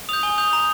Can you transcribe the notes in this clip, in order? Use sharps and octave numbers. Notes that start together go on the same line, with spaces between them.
D#6 G6 F7
G#5 G7
D#6 G6 F7
A#5 F7